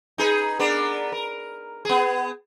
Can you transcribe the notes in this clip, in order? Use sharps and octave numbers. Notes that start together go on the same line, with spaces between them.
D#4 G#4 B4
B3 D4 A#4
A#4
B3 G#4